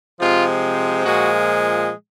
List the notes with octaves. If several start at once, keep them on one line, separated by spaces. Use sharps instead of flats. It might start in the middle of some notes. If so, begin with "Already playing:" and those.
C3 F3 G#3 F4
A#2 F3 G#3 F#4